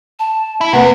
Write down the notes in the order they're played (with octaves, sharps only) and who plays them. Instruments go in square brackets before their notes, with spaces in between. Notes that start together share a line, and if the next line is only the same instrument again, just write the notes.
[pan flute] A5
[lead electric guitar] E4
[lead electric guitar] E2 [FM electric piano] C3 A#3 [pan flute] B4 [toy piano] F#5 A#5